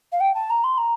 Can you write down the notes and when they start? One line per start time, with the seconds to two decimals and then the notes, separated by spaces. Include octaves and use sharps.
0.12 F5
0.20 G5
0.34 A5
0.50 A#5
0.64 C6
0.78 A#5